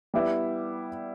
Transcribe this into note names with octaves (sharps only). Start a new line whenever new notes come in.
G3 B3 E4